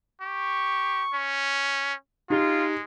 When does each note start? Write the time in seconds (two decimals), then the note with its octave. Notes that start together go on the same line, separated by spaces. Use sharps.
0.21 G4 C#6
1.14 C#4
2.30 G#3 D#4 F4 G4